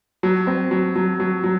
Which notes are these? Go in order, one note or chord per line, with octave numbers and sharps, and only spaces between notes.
F#3
C4
F#3
F#3
F#3
F#3